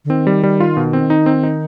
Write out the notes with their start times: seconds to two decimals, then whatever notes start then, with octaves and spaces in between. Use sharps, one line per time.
0.05 D3
0.10 D#3 C4
0.27 G3
0.43 G3
0.60 F4
0.77 B2
0.93 C4
1.10 D#4
1.26 C4
1.43 D#4